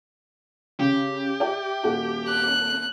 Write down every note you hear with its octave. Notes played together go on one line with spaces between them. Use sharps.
C#3 G4
D5 E5 G5
D#1 F#4 A4
F#6